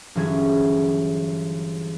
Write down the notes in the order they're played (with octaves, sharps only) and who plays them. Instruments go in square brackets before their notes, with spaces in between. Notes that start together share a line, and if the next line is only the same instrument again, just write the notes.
[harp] G1 E3 F#3 C#4 G#4 G#6